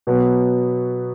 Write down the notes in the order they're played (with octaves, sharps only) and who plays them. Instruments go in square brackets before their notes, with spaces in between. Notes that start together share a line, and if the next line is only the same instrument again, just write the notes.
[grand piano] B2 F#3 B3